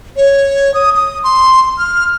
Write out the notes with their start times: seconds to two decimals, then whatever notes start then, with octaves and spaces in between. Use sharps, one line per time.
0.16 C#5
0.74 D#6
0.95 D#6
1.24 C6
1.78 F6